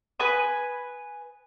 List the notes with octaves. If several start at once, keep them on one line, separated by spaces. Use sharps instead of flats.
B4 G#5 D#6